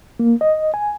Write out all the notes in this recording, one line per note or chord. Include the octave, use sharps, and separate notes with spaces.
A#3
D#5
G#5